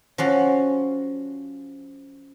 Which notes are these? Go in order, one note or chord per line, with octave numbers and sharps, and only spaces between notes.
F3 C#4 F#4